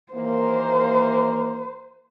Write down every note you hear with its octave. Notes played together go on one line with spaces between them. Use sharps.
D#2 E3 A#3 C5